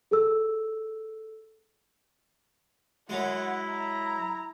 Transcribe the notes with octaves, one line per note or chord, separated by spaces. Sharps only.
G#4 A4 E6
F#2 F#3 G#3 E4 F#5
A#5